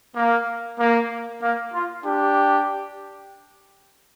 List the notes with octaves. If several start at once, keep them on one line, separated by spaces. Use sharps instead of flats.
A#3
A#3
A#3
F4
D4 G4